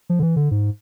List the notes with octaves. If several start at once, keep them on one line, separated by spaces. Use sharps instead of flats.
F3
D3
E3
D3
G#2